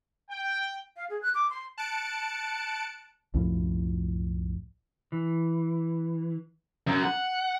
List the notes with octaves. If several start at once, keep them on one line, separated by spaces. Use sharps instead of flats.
G5
F5
G#4
F#6
D6
C6
A5 F#6 C#7 D7
C2 F#2 A2 F3
E3
F#2
F#5